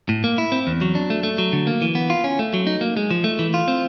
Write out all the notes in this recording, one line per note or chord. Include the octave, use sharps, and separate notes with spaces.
A2
A#3
E4
C4
E2
F#3
D4
A3
A3
F#3
D3
A#3
E3
B3
F4
C#4
A3
F#3
D#4
A#3
G#3
F3
A3
E3
F4
C4